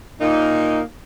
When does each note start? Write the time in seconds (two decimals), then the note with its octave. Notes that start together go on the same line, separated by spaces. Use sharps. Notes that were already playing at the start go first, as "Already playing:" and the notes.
0.20 A#2 A#3 D#4